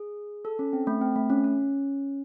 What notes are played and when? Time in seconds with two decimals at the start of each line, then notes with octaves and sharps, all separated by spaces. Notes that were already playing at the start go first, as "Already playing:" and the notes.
Already playing: G#4
0.45 A4
0.59 C#4
0.73 C4
0.87 A3
1.01 C4
1.16 A3
1.30 C#4
1.44 C#4